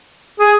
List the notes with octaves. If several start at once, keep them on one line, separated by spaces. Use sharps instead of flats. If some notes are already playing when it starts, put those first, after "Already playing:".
G#4